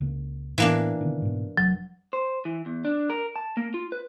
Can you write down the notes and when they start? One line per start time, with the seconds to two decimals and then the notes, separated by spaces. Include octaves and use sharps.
0.01 C#2 C#3 A#3
0.58 A2 E3 A#3 B3 D4
1.01 B2 D3 D#3
1.22 G#2 B2
1.57 F1 F#3
2.13 C5
2.45 E3
2.66 E2
2.85 D4
3.10 A#4
3.36 A5
3.57 A#3
3.74 F4
3.92 B4